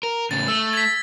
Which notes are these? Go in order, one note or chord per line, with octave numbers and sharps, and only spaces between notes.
A#4
A2 C#3 A6
A3 E6
G#6 B6